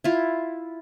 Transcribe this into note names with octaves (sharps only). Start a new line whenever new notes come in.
E4 F4